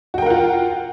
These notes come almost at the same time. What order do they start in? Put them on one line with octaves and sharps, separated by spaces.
F#4 G5 A#4 F#5 F4